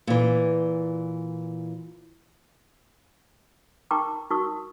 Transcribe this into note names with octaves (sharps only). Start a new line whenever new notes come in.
A#2 E3
D#4 A#4 G5 A#5 C#6 D6
D#4 F#4 A#4 C#6 D#6